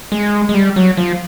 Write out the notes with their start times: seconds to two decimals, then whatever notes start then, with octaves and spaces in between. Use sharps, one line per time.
0.12 G#3
0.49 G#3
0.54 G3
0.76 F#3
0.97 F3